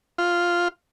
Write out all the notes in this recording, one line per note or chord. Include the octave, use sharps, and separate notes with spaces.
F4